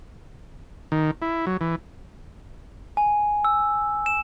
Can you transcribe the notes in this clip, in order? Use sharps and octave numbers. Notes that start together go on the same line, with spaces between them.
D#3
E4
F#3
E3
G#5
E6
E7